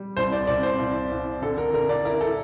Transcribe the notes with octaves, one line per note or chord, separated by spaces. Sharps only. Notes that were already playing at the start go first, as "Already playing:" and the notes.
Already playing: G3
C2 C5
D5
C2 D5
C5
C2
C2
D3 A4
A#4
D3 A#4
D5
E4 A#4
A4